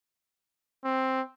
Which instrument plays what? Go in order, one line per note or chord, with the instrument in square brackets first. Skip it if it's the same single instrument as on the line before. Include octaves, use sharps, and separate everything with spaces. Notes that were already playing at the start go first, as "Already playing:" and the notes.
[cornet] C4